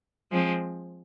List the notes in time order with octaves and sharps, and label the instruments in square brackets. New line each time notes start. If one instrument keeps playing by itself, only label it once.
[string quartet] F3 G#3 C4